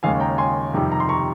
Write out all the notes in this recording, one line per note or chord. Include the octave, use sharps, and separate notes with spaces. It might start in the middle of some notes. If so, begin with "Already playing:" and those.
D#2 C#3 G#3 C#4 F5 G#5
G5 A#5
G#5 C6
F2 C3 D#3 G3
A#5
C6
A#5 C#6